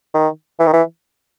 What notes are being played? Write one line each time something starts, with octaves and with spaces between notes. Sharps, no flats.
D#3
E3
D#3
E3